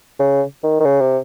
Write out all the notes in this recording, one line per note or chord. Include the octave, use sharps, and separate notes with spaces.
C#3
D#3
D#3
C#3
C3